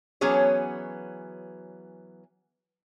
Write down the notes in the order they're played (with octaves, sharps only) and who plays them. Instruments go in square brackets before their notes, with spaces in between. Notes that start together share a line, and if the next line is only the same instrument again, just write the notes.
[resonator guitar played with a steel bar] E3 F#3 B3 C#4 G#4 C#5